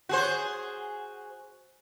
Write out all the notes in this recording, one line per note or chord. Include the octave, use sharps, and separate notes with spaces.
F#4 G#4 C5